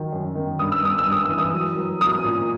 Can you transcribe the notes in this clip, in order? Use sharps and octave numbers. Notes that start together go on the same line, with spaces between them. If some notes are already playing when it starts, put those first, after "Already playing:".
Already playing: D#3 F#3
F#2
D#3
G2 D#6
E6
G2 D#6
E6
G2
D#6
E3 E6
D#6
F#3
F#3
F#3 D#6
A#2